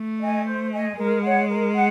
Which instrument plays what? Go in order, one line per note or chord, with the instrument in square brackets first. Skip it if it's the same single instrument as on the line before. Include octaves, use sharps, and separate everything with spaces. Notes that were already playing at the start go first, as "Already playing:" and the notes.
Already playing: [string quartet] A3
[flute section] D#5 G#5
C5
D#5 G#5
[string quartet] G#3 [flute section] A#4
[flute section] C#5 F#5
A#4
F#5